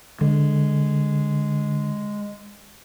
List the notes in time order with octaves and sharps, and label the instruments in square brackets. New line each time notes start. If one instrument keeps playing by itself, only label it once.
[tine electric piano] D3 [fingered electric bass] G#3